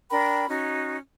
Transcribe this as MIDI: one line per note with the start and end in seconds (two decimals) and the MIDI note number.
0.11 0.45 62
0.11 0.45 70
0.11 0.45 79
0.11 0.45 83
0.49 0.97 61
0.49 0.97 63
0.49 0.97 66